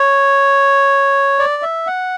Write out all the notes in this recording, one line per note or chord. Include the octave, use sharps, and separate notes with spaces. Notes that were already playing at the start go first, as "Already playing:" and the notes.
Already playing: C#5
D5
E5
F#5